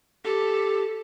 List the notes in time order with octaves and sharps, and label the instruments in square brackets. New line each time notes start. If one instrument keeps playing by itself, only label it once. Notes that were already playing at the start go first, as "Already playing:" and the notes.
[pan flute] G4 [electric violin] A4